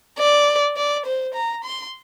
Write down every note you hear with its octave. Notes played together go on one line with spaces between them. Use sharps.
D5
D5
C5
A#5
C6